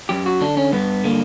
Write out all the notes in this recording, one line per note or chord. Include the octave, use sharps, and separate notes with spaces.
F#2 G4
F#4
D3 D4
C#4
G2 B3
D3 A#3